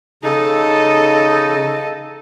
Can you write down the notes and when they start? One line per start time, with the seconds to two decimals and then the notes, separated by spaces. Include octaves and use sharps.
0.23 C#3 D#4 A4 D#5